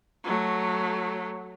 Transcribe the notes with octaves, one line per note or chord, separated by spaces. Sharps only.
F#3 A3